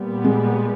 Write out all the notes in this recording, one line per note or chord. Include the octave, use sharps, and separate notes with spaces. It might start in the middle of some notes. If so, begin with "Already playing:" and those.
Already playing: A#2 G3 B3
G#3